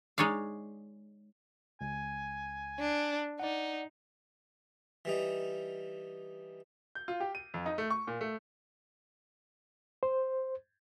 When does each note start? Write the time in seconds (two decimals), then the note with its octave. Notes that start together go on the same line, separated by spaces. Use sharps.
0.18 G#3 D#4 C#5 D5 F5
1.81 C#2 G#5
2.79 D4
3.40 D#4 D5 F#5
5.05 E3 G3 D#4
6.95 G6
7.08 F4
7.20 G4
7.35 D#7
7.54 F2
7.66 D#4
7.78 A3
7.90 C#6
8.07 A#2
8.21 A3
10.03 C5